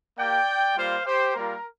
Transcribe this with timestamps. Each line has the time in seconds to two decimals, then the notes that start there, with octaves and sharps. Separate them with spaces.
0.17 A#3 G4 D5 G5
0.75 G3 A#3 F4 C5 F5
1.04 G4 C5
1.33 G3 A#3 F4 A#4